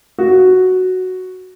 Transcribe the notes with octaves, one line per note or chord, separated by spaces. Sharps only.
F#4